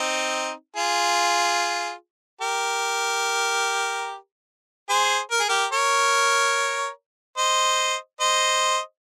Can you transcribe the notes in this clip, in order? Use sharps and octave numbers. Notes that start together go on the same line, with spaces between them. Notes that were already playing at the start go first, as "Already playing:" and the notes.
Already playing: C4 D#4
F4 G#4
G4 A#4
G#4 C5
A#4
G#4
G4 A#4
A#4 C#5
C5 D#5
C5 D#5